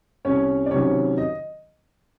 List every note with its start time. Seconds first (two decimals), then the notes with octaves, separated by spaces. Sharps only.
0.25 C2 C#4 C#5
0.66 D5
0.71 C3 D#3 F#3 C#4 C#5
1.18 D#5